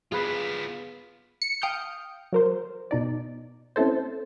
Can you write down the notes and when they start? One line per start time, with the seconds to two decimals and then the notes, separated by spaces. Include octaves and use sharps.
0.12 B3 F4 G#4 B4
1.42 C#7
1.62 F5 G5 D#6 F6 G6
2.32 F#3 A#4 C5
2.91 B2 D#4 D5
3.76 C4 C#4 E4 A4 C5